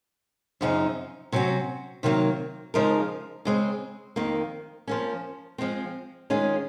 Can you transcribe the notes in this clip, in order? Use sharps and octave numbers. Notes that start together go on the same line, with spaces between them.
F#2 C#3 F3 C4 D#4
C3 F#3 C#4 F#4
C3 D#3 F#3 A#3
C#3 F3 G#3 D#4 A#4
C#3 G#3 C4
F2 D#3 A#3
F3 A#3 C#4
F3 G#3 C4
D#3 G#3 C#4 F4 G#4